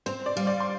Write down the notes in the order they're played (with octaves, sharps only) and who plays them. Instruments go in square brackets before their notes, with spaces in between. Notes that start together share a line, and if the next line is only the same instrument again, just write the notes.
[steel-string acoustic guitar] C4 [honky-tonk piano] C5
[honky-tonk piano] D5
[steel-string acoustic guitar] G3 [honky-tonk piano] F5
[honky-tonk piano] D5
C6